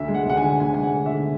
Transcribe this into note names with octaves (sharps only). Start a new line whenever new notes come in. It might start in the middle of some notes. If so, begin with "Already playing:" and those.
Already playing: D2 E5
G#3
F#5
D2 F#5
G#5
D3
D2 G#5
G#3 G#5
F#5
D2
E5
D3